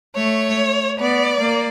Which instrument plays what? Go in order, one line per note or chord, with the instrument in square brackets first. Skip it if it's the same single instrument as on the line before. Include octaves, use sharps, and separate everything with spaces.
[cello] A3 [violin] C#5
[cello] B3 [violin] D5
[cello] A#3